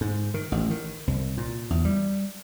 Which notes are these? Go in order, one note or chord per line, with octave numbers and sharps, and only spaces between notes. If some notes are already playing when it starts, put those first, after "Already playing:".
G#2
D#3
A1
D#3
C2
A#2
E2
G3